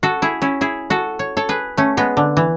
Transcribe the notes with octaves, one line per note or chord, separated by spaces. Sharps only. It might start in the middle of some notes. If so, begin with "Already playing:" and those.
F#4 A4
E4 G#4
C#4 E4
E4 G#4
F#4 A4
C#5
A4 C#5
G#4 B4
A3 C#4
G#3 B3
D3
E3